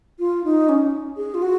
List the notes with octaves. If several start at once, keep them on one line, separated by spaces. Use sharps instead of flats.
F4
D#4
C#4
G#4
F4
F#4